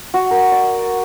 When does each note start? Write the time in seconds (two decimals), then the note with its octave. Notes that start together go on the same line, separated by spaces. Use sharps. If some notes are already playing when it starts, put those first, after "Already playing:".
0.14 F#4
0.31 A#4
0.52 D5